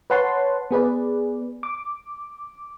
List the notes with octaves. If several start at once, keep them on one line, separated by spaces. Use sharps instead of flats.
B4 C#5 F#5 A5 C6
B3 G#4 B4 D5
D6